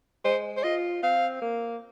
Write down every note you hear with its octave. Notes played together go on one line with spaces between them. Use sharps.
G#3 C5
C5
F4 D#5
C4 F5
A#3